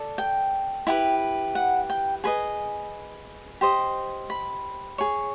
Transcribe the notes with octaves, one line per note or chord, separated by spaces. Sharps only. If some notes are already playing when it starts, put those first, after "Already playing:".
Already playing: A4 D5
G5
E4 G4 B4
F#5
G5
G#4 B4 D#5 G#5
G4 C5 D#5
B5
G#4 C#5